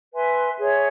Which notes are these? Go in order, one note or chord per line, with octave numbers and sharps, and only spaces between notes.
B4 E5 G#5 C6
G#4 C#5 E5